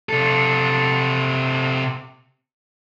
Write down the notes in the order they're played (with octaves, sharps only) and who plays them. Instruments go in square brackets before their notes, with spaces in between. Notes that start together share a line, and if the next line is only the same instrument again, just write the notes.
[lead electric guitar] C3 A4